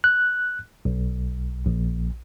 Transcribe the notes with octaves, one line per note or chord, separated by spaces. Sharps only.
F#6
B1
A#1